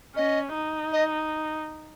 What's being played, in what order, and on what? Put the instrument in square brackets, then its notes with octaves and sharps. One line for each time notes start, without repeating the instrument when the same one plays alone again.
[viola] C#4 [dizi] D#5
[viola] D#4
[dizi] D#5